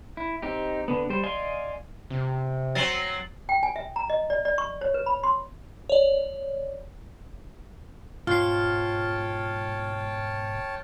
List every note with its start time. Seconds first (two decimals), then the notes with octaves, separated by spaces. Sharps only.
0.17 E4
0.42 C4 D#4 G4
0.88 D3 B3
1.10 G3 C5
1.23 D5 D#5 F5 G#5 C6
2.10 C3
2.75 F#3 C4 A6 C7 F#7
3.49 G5
3.63 G#5
3.76 E5
3.96 A#5
4.10 D#5
4.30 D5
4.45 D5
4.58 C#6
4.81 C#5
4.94 B4
5.06 B5
5.24 C6
5.89 C#5 D5
8.27 G#2 B2 F4 C#5 G5 A5 F6 C7